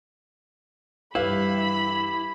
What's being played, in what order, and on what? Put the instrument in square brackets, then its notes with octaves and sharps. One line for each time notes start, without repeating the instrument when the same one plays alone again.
[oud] G2 E3 [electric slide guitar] E4 [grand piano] G4 B4 F5 [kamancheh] B5